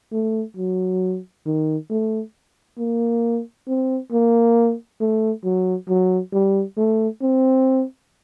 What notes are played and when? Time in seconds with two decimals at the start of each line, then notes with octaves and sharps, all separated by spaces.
0.12 A3
0.57 F#3
1.46 D#3
1.90 A3
2.79 A#3
3.68 C4
4.12 A#3
5.01 A3
5.44 F#3
5.88 F#3
6.32 G3
6.77 A3
7.22 C4